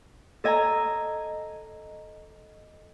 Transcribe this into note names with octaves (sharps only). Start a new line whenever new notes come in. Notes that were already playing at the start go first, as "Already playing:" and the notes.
A4 D#5 G#5 A#5